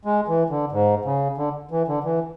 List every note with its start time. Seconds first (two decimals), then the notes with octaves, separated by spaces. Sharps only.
0.05 G#3
0.28 E3
0.50 D3
0.72 G#2
1.05 C#3
1.38 D3
1.71 E3
1.88 D3
2.04 E3